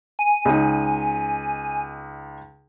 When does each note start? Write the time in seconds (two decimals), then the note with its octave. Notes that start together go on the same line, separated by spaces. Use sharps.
0.19 G#5
0.45 C#2 D#4